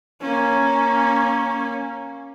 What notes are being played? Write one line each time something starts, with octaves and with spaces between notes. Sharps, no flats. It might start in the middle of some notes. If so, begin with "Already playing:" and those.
A#3 C#4